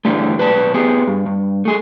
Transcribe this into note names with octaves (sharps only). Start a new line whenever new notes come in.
G2 D3 E3 G3 A3
B1 B4 D5 A5
B3 G4 G#4
G2
G2
A3 G#4